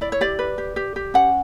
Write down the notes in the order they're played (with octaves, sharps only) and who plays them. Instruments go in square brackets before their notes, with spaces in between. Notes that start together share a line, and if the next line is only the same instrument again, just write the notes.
[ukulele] E4 D5
C#5
G4 D5
B4
G4
G4
G4
C#4 F#5